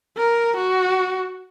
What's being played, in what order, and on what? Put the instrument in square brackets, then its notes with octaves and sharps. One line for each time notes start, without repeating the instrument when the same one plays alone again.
[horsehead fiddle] A#4
F#4